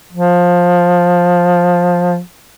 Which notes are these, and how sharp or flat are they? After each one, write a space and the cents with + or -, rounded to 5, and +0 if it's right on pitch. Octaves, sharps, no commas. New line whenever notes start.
F3 +15